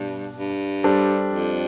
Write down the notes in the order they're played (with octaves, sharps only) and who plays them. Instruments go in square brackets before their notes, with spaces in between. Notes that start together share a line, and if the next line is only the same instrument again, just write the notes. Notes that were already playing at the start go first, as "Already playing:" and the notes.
Already playing: [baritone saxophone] G2 [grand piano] B2 D4
[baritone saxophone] G2
[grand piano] G3 D4 A4 C5
[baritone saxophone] F2